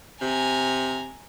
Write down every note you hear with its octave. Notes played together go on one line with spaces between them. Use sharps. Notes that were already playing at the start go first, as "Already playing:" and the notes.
C3 G#5 A#5